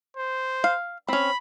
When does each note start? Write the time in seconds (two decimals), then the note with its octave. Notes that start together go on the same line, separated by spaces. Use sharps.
0.17 C5
0.64 F5
1.09 C4 C#4 B5